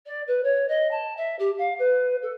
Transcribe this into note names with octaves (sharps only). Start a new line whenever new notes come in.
D5
B4
C#5
D#5
A5
E5
G4
F5
B4
A4